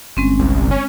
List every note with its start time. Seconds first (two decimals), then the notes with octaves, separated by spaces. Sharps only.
0.17 G1 G#3 C4 C#4
0.39 C2
0.71 C#4